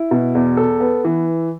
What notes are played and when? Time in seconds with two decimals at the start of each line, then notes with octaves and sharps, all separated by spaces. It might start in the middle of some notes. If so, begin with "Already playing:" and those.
Already playing: E4
0.11 B2
0.35 E2
0.57 A4
0.80 B3
1.05 E3